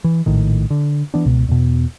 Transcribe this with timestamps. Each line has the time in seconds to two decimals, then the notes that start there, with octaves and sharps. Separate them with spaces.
0.04 E3
0.26 A#1 A2 D#3
0.71 D3
1.14 E3 B3 D4
1.25 C#2 B2
1.48 E2 B2